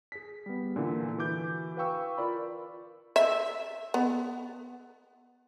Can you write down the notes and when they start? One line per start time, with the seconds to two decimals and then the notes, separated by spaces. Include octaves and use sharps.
0.12 G#4 B6
0.46 G3 B3
0.76 A#2 D3 E3
1.18 E3 F#4 D6 G6
1.77 B4 F5 G5 C#6 E6
2.18 F4 A#4 D5 B5
3.16 E5
3.94 B3